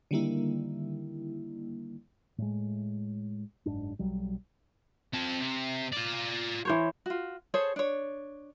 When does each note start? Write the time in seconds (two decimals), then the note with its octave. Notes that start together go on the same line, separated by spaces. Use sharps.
0.11 D3 D#3 G3 A#3 E4
2.38 A2 G#3
3.66 F#1 G#2 D4
3.99 B1 F#3 G3
5.13 C4 A5
5.39 C3
5.93 F4 D5
6.65 E3 C5 C#5
7.06 F4 F#4
7.54 G#4 A4 C5 C#5
7.76 D4 C#5